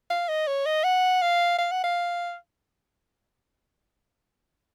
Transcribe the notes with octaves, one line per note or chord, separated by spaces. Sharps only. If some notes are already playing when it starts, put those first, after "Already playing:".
F5
D#5
C#5
D#5
F#5
F5
F5
F#5
F5